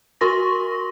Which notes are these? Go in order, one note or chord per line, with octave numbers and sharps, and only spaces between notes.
F#4 A#4 C6 C#6 A#6